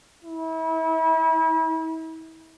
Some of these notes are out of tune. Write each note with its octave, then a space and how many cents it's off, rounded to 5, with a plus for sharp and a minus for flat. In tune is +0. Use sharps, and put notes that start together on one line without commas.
E4 -35